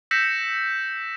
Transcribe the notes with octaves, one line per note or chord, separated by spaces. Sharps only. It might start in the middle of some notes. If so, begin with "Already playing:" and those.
E6 G6 A#6 B6 C#7 E7